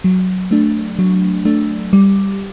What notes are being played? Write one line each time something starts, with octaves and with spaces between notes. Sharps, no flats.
F#3
A3 D4
F#3
A3 D4
G3